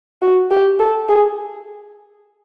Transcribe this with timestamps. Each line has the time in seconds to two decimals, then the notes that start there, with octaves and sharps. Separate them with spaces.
0.22 F#4
0.51 G4
0.80 A4
1.09 G#4